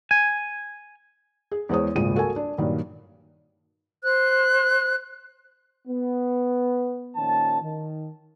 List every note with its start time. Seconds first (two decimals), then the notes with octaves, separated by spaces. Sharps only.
0.11 G#5
1.51 G#4
1.69 E2 G#3 C5 C#5 D#6
1.96 D#1 G#1 C#2 G#3 F4 D#7
2.16 F#4 A4 A#4 G#5
2.36 D4
2.58 G2 A#2 D#3 F#3
4.03 C5 F#6
5.88 B3
7.16 A#2 D#3 F3 A#3 C#4 A5
7.61 D#3